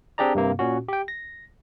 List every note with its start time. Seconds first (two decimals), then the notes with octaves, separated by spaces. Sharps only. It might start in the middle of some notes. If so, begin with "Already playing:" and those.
0.18 C4 D4 G4 G#4 D5 A#5
0.35 G2 C3 A#3
0.59 A#2 C#4 F#4
0.89 G4 G5
1.08 A#6